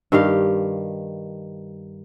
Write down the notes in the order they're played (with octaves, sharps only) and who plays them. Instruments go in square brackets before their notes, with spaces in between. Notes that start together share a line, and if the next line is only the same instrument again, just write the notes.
[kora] G2 D#3 G4 F5